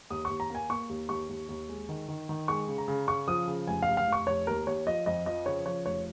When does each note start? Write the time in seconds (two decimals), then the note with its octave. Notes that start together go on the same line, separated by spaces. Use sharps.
0.10 D#2 D#6
0.25 C#6
0.30 D#2
0.40 A#5
0.50 A#3 G#5
0.70 A#3 C#6
0.89 D#2
1.09 D#2 C#6
1.29 D#2
1.49 D#2
1.69 G#3
1.89 D#3
2.08 D#3
2.29 D#3
2.48 G#3 C#6
2.68 C#3
2.78 A#5
2.88 C#3
3.08 C#3 C#6
3.28 F3 D#6
3.47 C#3
3.67 F1 G#5
3.82 F5
3.88 F1
3.97 F5
4.07 F1
4.12 C#6
4.27 F1 C#5
4.47 D#2 A#4
4.67 D#2 C#5
4.87 F3 D#5
5.06 F2 D#5
5.26 F3 D#5
5.46 C#3 C#5
5.66 F3 C#5
5.86 F1 C#5